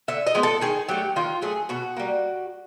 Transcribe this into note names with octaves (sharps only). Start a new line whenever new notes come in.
D3 E5
D#5
F3 G#3 B3
A4
D#3 G#4
F#3 A3 G4
D#3 F4
F#3 A3 G#4
B2 F#4
G3 A#3